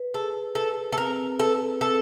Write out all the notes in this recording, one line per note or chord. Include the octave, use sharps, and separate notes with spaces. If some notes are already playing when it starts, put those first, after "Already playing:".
Already playing: B4
G#4 A4
A4 B4
A4
C4 A#4
A4 B4
C4 A4